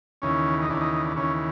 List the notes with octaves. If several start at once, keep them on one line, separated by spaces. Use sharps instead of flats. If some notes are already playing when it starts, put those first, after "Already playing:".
D#2 C#3 E3 C#4
D#4
D#2 C#3 E3 D4
D#4
D#4
D4
D#2 C#3 E3 C#4